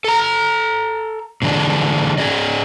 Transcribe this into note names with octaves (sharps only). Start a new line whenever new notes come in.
A4 A#5
A#2 D3 E3 G#3 D4
C#4 G#4 D5 D#5